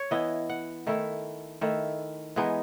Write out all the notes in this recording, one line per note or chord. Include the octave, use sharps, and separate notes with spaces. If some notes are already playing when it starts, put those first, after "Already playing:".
Already playing: C#5
E3 B3 E4 D#5
F#5
D#3 A3 E4
D#3 A3 E4
E3 G#3 B3 D#4